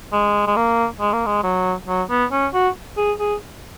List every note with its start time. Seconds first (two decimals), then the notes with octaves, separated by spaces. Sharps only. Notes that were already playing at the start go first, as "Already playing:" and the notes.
0.12 G#3
0.47 G#3
0.56 A#3
1.00 G#3
1.13 A#3
1.26 G#3
1.43 F#3
1.87 F#3
2.09 B3
2.31 C#4
2.53 F#4
2.97 G#4
3.19 G#4